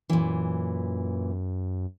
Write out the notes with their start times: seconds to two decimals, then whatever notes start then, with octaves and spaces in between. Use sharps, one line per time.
0.10 F#2 A#2 E3